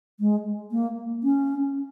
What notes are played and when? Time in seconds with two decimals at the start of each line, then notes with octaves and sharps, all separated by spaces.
0.20 G#3
0.72 A#3
1.24 C#4